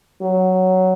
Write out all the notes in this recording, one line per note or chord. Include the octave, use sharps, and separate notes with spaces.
F#3